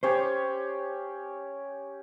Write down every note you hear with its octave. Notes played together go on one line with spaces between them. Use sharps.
C#4 G4 C5 C#5